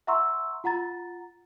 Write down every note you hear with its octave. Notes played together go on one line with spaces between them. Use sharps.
E5 F#5 A#5 C6 C#6 E6
F4 F#5 A#5 A6